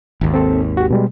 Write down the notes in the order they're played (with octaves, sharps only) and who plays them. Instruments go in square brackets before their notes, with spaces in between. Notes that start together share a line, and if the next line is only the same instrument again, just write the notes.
[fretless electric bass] G#1 D#2
[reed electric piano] C4 A4
F#4 G4
B2 G3 G#3